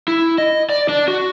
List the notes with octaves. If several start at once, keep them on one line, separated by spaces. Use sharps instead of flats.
E4
D#5
D5
D4
F#4